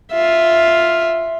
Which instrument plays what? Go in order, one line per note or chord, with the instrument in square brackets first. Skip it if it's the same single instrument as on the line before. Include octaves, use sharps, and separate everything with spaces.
[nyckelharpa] F4 E5